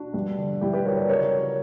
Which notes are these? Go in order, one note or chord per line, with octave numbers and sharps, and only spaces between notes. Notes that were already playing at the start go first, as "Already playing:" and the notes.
Already playing: D4 F#4
G2
D3
G2 E4 G4
G4 B4
F#3 A#4 C#5
B4 D5
C#3 A#4 C#5
F#3